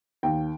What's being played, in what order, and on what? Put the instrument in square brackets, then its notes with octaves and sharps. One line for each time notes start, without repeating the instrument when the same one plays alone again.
[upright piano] D#2 G5